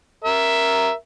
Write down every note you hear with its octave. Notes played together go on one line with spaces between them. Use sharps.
A#4 E5